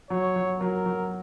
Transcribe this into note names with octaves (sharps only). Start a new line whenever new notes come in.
F#3 C#5
F#3
F#3 A#4
F#3